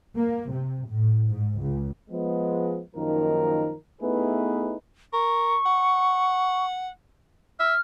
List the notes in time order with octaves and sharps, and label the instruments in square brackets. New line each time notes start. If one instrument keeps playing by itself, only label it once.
[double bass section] A#3
C3
A2
G#2
C#2
[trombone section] F3 G#3 B3
F#2 D#3 F3 A#3 D#4 A#4
A3 B3 D#4 E4 G#4 B4
[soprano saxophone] A#4 [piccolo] C#6
[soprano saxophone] F#5
[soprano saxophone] E5 [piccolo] F6